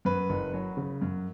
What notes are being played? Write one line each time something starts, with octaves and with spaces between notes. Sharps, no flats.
F#2 B4
F#1
F#3
C#3
F#2